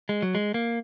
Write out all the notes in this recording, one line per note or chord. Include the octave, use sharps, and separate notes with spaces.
G#3
F#3
G#3
A#3